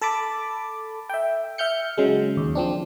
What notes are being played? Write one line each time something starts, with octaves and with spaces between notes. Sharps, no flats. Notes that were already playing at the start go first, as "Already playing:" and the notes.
A4 A5 B5 D6
E5 G5
E5 F6 G6 C#7
C#3 F#3 G#3
D#2
F3 C4 D4